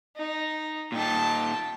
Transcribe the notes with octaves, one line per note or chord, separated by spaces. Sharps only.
D#4
A#2 D#4 G5 A5